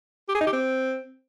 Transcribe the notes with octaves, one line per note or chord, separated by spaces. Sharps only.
G4
G#4
D#4
G4
C4